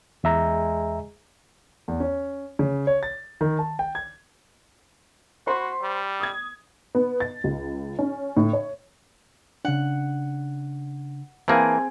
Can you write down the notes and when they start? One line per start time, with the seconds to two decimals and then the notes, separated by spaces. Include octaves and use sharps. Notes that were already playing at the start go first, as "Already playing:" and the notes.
0.24 E2 G#3 E5 A#5
1.88 E2
2.00 C#4
2.59 C#3
2.87 C#5
3.03 A6
3.41 D#3
3.59 A5
3.79 G5
3.95 G#6
5.47 F#4 C5 B5 C6
5.81 G3
6.20 D#6 G#6
6.95 B3
7.20 A6
7.44 C#2
7.99 C#4
8.37 A2
8.53 C#5
9.65 C#3 D4 F#5
11.48 E3 A#3 C4 G#4 F5 A5